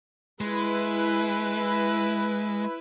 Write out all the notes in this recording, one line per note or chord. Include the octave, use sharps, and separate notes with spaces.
G#3 E4 B4